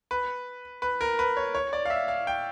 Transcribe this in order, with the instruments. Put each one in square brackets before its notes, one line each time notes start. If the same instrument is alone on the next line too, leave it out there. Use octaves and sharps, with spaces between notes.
[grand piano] B4
B4
A#4
B4
C#5
C#5
D5
F5
E5
F5
G5